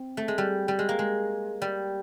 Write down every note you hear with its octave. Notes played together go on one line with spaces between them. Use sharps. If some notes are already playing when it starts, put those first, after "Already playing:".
Already playing: C4
A3
G#3
G3
G3
G#3
A#3
G#3
G3